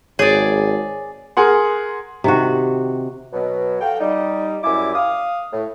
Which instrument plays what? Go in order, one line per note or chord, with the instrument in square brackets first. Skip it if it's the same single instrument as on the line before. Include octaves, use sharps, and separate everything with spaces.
[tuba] G#1 [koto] G#4 D5 [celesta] C#5
[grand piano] G#4 A#4 F#5 C6
[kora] C3 D#3 F#4
[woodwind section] B2 F#3
F#4 A4 F5 G5
G3 D#4
F#2 G3 E4 G#5 D6
F5 D#6
A2